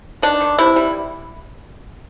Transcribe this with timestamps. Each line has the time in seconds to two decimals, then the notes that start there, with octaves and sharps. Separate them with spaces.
0.22 D#3 D4
0.41 D#3
0.58 C3 E4
0.76 G3